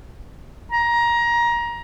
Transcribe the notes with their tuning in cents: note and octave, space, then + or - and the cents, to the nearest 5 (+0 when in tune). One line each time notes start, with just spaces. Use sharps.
A#5 +20